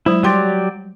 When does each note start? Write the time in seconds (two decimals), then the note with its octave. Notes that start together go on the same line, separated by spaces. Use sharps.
0.06 F#3 G#3 E4 C5
0.23 F#3 G3 G4 D5 G5 C6